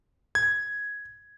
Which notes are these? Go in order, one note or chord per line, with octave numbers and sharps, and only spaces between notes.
G#6